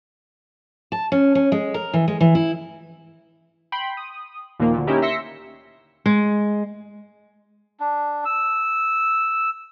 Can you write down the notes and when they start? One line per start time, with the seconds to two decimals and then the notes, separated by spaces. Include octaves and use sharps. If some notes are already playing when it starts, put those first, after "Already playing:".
0.92 A5
1.12 C#4
1.35 C#4
1.52 G#3
1.74 A#4
1.94 E3
2.08 G#3
2.21 E3
2.35 E4
3.72 G5 B5 C6
3.97 D#6
4.59 D#2 A#2 F3 A#3
4.73 D2 A#2
4.87 C#4 D#4 E4 G4 A#4
5.02 E5 C6 E6 A#6 B6 C#7
6.06 G#3
7.80 D4
8.25 E6